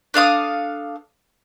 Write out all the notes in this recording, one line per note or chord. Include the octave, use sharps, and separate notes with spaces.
D4 A4 F5 D#6